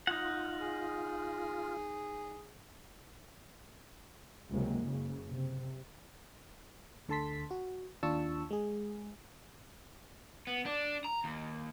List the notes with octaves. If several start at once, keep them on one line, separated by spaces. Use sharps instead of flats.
D#4 F4 F#5
G#4
C#2 C3 F#3 G#3 A#3
F#1 C#3
C3
D2 D3 A4 A5 C6 B6
F#4
D#2 D4 F4 A5 C#6 E6
G#3 G#4
B3
D4
A#5
D#2